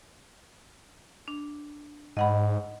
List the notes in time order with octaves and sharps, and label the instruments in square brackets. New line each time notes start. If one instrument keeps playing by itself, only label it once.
[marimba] D4
[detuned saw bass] G#2 [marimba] D#5 F#5 B5